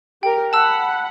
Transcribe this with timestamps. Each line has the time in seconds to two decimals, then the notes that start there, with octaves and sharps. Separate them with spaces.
0.23 G4 A#4 G5
0.53 F#5 A5 B5 E6